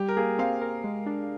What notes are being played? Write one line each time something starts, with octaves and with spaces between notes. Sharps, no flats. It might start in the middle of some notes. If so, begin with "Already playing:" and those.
Already playing: G3 G4
A#4
A#3 G#4
C4 F5
A#4
G#3
D4